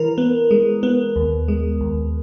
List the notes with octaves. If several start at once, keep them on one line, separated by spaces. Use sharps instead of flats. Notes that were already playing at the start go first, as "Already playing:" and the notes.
Already playing: E3 A#4
B3
G#3
B3
D#2
G#3
D#2